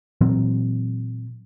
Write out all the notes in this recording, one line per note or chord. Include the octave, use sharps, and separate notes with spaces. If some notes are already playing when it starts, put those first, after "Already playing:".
A#2 E3 F#3 C4